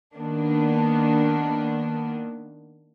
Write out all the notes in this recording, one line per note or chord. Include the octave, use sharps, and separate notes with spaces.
D#3 A#3 B3 D4